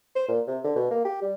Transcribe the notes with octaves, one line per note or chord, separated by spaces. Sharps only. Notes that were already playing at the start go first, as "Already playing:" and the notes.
C5
A#2
C3
D3
B2
A#3
G4
G3